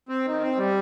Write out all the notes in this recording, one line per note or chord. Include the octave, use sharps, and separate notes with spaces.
C4
D#3
C4
G3